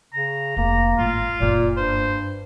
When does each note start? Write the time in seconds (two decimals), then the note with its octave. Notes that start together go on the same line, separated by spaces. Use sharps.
0.13 C#3 A#5
0.57 F1 A#3
0.98 G#1 A2 F4
1.40 F#1 A#2 A#3
1.77 G2 C5